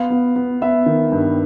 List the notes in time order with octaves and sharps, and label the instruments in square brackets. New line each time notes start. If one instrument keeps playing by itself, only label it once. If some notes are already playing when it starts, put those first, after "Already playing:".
Already playing: [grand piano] B3 F5
B3
B3
B3 E5
D#3
G2